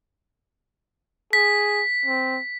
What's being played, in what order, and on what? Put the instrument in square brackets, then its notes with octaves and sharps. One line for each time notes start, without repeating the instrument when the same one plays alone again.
[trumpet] G#4 [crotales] B6
[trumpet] C4